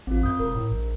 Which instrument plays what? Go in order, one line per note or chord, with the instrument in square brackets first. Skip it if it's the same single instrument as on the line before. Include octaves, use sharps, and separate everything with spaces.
[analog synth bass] A1 [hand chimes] C4 F4
[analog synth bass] F#2 [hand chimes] D#6 G6
[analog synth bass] E1 [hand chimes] A#4
[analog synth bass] A2
A#1